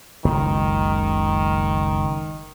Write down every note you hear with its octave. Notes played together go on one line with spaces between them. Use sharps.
F#1 C#2 D#3